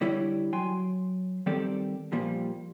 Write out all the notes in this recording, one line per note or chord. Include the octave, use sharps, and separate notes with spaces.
D3 G3 E4 G4 C#5 D5
F#3 G5 G#5 C6
D#3 G3 C4 G4 A4 D5
A#2 F3 G3 A#3